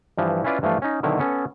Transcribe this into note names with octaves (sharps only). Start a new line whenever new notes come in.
G2 E3 F3
C#4 E4 F4 B4 D5
G2 E3 F3 A3 F4
C#4 D#4
B2 D3 D#3 F#3 E4
B3 C#4 A4